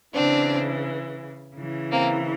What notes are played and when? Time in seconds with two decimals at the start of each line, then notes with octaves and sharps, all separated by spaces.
0.15 C#3 E3 C4 D4
1.57 C#3 E3
1.92 A#3 C4